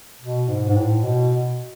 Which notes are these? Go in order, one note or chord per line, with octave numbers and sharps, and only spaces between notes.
B2
G#2
G#2
A2
B2